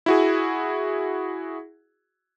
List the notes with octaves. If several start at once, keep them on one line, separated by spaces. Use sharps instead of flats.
E4 F#4 G#4